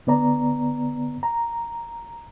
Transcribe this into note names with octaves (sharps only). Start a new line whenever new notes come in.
D3 B3 D5 A#5
A#5